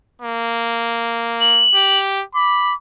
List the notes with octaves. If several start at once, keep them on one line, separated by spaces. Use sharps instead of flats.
A#3
F#7
G4
B5 D6